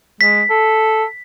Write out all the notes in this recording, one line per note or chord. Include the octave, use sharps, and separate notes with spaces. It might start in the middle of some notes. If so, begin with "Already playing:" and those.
G#3 B6
A4